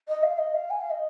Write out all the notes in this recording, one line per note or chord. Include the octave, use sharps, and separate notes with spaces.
D#5
F5
D#5
F5
G#5
F5
D#5